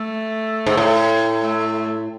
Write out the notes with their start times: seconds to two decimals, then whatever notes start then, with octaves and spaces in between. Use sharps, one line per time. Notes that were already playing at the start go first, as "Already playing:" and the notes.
Already playing: A3
0.67 G#2
0.77 A2
1.42 A3